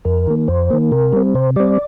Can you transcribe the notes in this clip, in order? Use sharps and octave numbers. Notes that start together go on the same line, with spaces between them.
F2 A#4
D#3 A#3
F2 C5
D#3 A#3
C3 A#4
G3 C4
C3 C5
G3 C4 D5